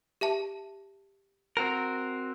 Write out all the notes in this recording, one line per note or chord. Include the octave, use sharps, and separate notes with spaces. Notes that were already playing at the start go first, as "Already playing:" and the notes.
G4 E5 A5
C4 F#4 A#4